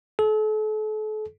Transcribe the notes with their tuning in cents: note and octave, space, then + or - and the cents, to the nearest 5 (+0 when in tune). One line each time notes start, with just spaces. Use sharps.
A4 -40